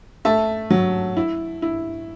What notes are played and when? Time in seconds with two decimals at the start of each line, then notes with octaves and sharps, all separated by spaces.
0.25 A3 E5 A5
0.71 F#3
1.17 E4
1.62 E4